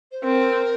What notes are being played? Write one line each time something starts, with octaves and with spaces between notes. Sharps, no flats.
C5
C4 A#4